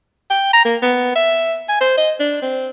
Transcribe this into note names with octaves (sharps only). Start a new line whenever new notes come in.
G5
A#5
A#3
B3
E5
G#5
C5
D#5
D4
C4